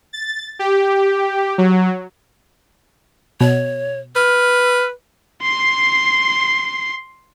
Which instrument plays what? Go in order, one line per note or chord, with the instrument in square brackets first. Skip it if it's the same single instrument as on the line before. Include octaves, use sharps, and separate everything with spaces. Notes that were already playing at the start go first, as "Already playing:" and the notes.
[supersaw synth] A6
G4
F#3
[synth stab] B2 [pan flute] C#5
[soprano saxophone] B4 [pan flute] F6
[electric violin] C6 C7